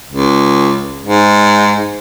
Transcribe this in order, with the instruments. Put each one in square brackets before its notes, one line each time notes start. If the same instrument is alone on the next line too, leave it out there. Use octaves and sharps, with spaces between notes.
[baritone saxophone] C#2
G#2